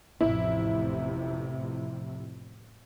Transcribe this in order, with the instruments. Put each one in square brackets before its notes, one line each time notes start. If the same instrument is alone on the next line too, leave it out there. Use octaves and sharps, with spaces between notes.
[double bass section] A1 F2 C3 [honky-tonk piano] E4